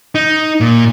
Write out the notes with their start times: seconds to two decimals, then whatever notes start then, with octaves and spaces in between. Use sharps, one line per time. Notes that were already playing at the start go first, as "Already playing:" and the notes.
0.15 D#4
0.61 A#2